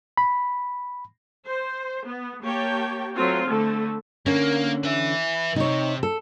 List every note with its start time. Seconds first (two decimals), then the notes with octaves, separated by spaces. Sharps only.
0.17 B5
1.46 C5
2.05 B3
2.42 A#3 G4 C#5 G5 A5
3.14 F#3 A3 C4 F4 F#4
3.46 D3 A3 A4
4.26 D3 A#3 C#4
4.84 B4 E5
5.56 C3 D#4 C#5
6.03 A4